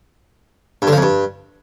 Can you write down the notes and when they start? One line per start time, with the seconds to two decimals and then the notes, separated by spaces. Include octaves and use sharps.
0.82 G2
0.87 D3
0.92 F3
0.97 F2
1.02 G2